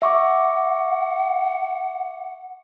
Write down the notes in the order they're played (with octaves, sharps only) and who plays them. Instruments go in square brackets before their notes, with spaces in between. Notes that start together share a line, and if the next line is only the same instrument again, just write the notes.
[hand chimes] E5 C#6 D6 [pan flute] F#5